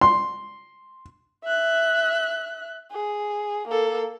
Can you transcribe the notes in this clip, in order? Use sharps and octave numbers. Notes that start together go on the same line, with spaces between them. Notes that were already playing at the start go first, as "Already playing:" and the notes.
C6
E5 F#6
G#4
A#3 A4